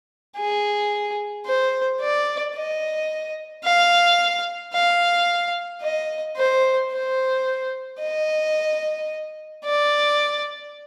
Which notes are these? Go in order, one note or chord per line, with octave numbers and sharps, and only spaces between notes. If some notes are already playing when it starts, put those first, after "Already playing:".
G#4
C5
D5
D#5
F5
F5
D#5
C5
C5
D#5
D5